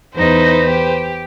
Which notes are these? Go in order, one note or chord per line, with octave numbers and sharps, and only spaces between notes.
E2 D#4 B4 C5
G4